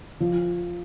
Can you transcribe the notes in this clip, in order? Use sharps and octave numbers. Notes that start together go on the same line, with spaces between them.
F3